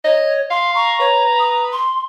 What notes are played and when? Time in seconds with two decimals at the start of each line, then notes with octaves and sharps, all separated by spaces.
0.04 C#5 D#5
0.50 F5 C6
0.75 A#5 C#6
1.00 B4 C#5
1.39 D#6
1.72 C6